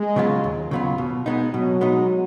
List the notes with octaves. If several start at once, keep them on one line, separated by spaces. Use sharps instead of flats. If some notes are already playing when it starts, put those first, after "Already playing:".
Already playing: G#3
C#3 F#3 B3 F4
D#2
C#3 F#3 B3 F4
B2
G#3 B3 D#4
B2 F#3
G#3 B3 D#4